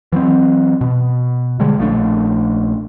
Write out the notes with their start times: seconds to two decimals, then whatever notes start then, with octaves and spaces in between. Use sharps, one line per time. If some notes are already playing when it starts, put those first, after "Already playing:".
0.12 E3 F#3 B3 C4
0.81 B2
1.59 B2 D3 G3 G#3
1.78 A#1 F3 A3 D4